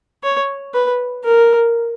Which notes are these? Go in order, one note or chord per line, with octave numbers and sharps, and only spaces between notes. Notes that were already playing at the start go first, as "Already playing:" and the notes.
C#5
B4
A#4